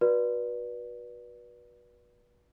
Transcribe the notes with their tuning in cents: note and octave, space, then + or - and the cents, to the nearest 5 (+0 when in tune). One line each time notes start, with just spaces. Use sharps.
F#4 -15 B4 -35 D5 +10